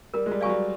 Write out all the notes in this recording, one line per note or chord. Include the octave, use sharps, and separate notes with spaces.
G3 A#4
G#3
G3
F#3 D5 F5 G#5 C#6
G3